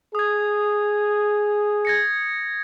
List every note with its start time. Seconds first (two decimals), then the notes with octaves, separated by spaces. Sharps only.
0.15 G#4 D#6 G#6
1.85 G#6 A#6 C#7